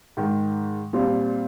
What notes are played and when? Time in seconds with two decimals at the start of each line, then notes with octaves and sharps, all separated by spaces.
0.17 G#2 D#3 G#3
0.93 A#2 G3 C4 F4